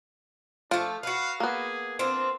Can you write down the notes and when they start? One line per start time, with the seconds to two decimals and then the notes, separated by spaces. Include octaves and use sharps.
0.71 F3 A3 D4 F4
1.03 F#4 B4 F5
1.40 A#3 B3 G#4
1.99 C4 D4 F4